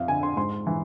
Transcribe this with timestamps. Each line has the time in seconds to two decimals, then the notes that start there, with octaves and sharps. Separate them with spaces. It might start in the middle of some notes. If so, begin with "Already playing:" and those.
Already playing: F2 E5 F5
0.08 D3 G#5
0.23 C6
0.37 G#2 C6
0.67 E3